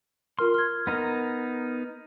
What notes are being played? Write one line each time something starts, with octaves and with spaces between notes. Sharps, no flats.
F4 A#4 C6 F6
F6 G#6
B3 D#4 A#4